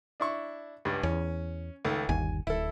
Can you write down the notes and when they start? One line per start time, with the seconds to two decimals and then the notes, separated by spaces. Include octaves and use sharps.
0.20 D4 E4 C#6
0.85 C#2 G2
1.03 E2 C#4
1.85 C#2 D#3 A3
2.09 G1 D#2 G#5
2.47 D1 E4 A4